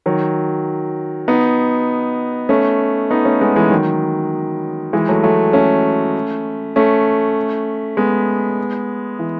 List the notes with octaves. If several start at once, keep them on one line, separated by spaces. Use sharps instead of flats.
D#3 F#3
B3 D#4
A3 C#4
B3 D#4
A3 C#4
G#3 B3
E3 G#3
D#3 F#3
E3 G#3
F#3 A3
F#3 A3
A3 C#4
A3 C#4
G#3 B3
E3